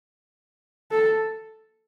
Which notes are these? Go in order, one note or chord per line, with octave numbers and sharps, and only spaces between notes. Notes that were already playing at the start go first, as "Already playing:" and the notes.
A4